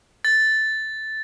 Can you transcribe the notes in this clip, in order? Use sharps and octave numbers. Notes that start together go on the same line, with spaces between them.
A6